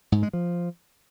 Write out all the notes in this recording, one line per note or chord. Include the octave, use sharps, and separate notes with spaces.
G#2
G#3
F3